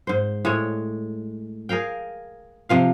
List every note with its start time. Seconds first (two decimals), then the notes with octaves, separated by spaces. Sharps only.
0.07 G#2 C5
0.45 A2 G#3 C#5
1.69 G#4 A#4 F5 G5
2.69 C3 F3 F5